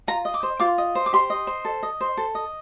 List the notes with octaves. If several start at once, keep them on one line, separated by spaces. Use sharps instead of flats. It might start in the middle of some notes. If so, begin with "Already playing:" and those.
F4 A#5
D#5
D6
C5
F4 D6
D#5
C5
D6
G4 C6
D#5
C5
A4
D#5
C5
A4
D#5